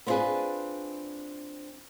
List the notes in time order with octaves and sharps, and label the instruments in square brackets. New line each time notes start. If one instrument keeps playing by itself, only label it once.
[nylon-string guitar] B3 C4 D4 F4 G#4 B4